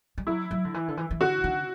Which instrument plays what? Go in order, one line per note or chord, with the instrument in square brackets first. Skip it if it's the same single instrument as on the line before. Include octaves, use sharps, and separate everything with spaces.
[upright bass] G3
[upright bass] F#3 [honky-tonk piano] E4
[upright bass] F#3
D3
E3
D3
E3
E3
[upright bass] D3 [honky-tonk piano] F#4
[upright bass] D3